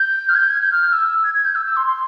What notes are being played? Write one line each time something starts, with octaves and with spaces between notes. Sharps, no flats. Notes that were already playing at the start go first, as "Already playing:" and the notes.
Already playing: G6
F6
G#6
G6
G#6
G6
F6
E6
G#6
G#6
G6
E6
E6
C6
C6